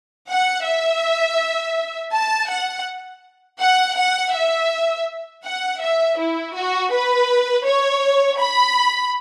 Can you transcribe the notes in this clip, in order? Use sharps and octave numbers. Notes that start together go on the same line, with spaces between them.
F#5
E5
A5
F#5
F#5
F#5
E5
F#5
E5
E4
F#4
B4
C#5
B5